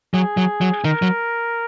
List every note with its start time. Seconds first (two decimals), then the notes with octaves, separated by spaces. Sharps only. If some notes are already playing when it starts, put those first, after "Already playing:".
0.14 F#3 G#4
0.37 F#3
0.61 F#3
0.84 D#3 A#4
1.02 F#3